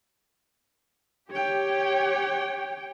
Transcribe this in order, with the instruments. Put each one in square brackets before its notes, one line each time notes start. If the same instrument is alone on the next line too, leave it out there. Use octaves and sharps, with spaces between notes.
[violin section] G4 [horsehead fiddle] C#5 G5